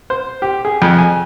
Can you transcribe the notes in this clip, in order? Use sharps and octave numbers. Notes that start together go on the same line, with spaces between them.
C5
G4
G#4
F2
G#5